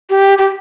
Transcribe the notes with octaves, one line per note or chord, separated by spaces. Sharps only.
G4
G4